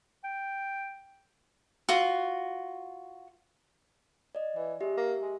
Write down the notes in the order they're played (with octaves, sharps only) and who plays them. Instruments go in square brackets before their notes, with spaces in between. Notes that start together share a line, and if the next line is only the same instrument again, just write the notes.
[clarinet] G5
[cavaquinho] F4 F#4
[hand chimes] D5 D#5
[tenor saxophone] E3 [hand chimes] D5
[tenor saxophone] G#3 [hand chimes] G4 E5
[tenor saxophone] A#3
G#3